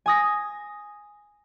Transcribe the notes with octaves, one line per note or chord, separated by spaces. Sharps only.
G#5 D#6 A#6